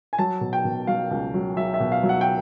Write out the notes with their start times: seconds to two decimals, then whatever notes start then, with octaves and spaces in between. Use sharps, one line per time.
0.13 G#5
0.19 F#3 A5
0.41 B2
0.53 G5
0.65 B2
0.87 F#3 F5
1.11 C#2
1.34 F#3
1.57 F#3 E5
1.74 E5
1.80 B2
1.92 F5
2.03 F#3
2.09 F#5
2.21 G5